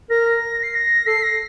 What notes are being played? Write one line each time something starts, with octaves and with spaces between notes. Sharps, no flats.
A#4 A#6
C7
A#6
A4 C7
A#6